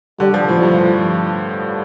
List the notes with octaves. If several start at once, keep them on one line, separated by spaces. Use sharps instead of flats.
D3 G3
F3
A2 F3
G2